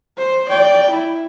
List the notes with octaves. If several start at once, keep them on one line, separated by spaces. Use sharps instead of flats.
C5
D5 G5
E4